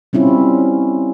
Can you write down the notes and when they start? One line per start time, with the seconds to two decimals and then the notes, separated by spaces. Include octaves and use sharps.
0.13 G3 C4 C#4 E4 F4